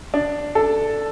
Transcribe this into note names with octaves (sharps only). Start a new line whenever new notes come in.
D4
A4